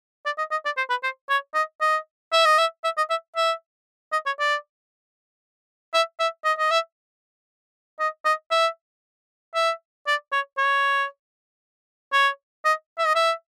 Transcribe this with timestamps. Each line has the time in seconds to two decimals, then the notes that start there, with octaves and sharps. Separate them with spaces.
0.26 D5
0.38 D#5
0.51 D#5
0.65 D5
0.77 C5
0.90 B4
1.03 C5
1.29 C#5
1.54 D#5
1.81 D#5
2.33 E5
2.46 D#5
2.58 E5
2.84 E5
2.98 D#5
3.10 E5
3.36 E5
4.12 D#5
4.26 C#5
4.39 D5
5.94 E5
6.20 E5
6.45 D#5
6.59 D#5
6.71 E5
8.00 D#5
8.25 D#5
8.51 E5
9.55 E5
10.07 D5
10.32 C#5
10.58 C#5
12.13 C#5
12.65 D#5
12.98 E5
13.06 D#5
13.15 E5